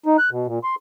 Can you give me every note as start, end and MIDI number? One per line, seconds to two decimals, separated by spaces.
0.06 0.17 63
0.18 0.30 90
0.31 0.47 47
0.47 0.59 46
0.64 0.75 84